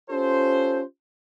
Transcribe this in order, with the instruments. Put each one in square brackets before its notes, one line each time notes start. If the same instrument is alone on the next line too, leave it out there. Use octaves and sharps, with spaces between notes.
[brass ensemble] C#4 F4 G4 A4 C5